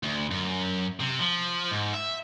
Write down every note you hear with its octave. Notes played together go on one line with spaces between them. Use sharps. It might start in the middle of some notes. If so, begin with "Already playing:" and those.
D2
F#2
C3
F3
G#2
E5